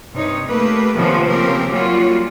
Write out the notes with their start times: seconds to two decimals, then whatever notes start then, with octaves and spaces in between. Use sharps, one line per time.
0.14 G2 C3 D#4 C#5
0.46 A3 A#3 G4 B4
0.96 C3 D#3 F3 A#3 B3 C#4
1.28 C#3 F3 A#3 C4 G4 A#4
1.69 F#3 G3 A#3 C#4 F4 F#4